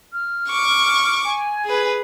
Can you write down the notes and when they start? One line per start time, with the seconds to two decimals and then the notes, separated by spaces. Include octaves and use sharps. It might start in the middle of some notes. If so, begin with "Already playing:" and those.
0.13 F6
0.49 C#6 D6
1.24 G#5
1.65 G#4 B4